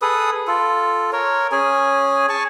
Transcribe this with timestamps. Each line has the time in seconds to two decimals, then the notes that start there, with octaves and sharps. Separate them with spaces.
0.02 G#4 A4 B4 D#6
0.47 F4 A4
1.12 A#4 C#5
1.52 C#4 G#4 G#5
2.29 G#5 A5 C#6